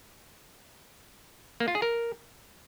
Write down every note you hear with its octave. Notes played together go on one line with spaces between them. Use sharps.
A#3
F4
G#4
A#4